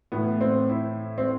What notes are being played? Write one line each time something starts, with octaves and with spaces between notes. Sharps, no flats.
A2 E3 B3
C4
E4
C4